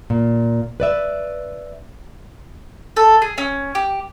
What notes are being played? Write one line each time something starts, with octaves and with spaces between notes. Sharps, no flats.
A#2
B4 D5 E5
A4
G#4
C#4
G4